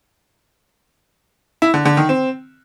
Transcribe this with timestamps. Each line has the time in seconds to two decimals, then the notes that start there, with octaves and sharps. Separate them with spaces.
1.62 E4
1.74 D3
1.85 D3
1.97 D#3
2.09 C4